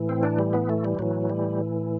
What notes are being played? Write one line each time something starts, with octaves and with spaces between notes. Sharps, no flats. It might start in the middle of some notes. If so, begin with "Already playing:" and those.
Already playing: A2 E3
C4
D4
G3
B3
A3
G3
A2 E3 F#3
G3